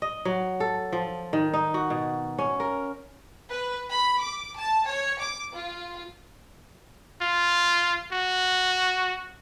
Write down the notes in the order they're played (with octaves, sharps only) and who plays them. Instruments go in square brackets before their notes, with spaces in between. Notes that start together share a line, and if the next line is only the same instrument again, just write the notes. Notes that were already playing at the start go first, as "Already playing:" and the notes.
[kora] D#5
F#3
A4
F3
D#3
D#4
F#4
B2
C#4
A#4
[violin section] B4
B5
D6
A5
C#5
D6
F4
[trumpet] F4
F#4